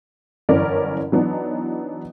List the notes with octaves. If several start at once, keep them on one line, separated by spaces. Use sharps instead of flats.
G1 F#2 E3 C#4 A#4 D5
E3 F#3 B3 D4 D#4